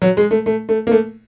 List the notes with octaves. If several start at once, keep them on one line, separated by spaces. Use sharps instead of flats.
F#3
G#3
A3
A3
A3
A#3
A3